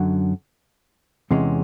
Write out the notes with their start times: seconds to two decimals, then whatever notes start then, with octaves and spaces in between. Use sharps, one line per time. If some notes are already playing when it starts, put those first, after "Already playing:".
Already playing: F#2 D3 F#3
1.31 E2 C3 E3 G#3 C#4